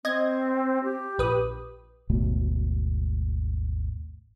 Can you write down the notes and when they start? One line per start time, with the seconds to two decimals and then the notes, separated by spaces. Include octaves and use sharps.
0.05 C4 D#5 G#6
0.83 G4
1.18 A#1 B4 D#6
2.10 G#1 D#2 B2 A3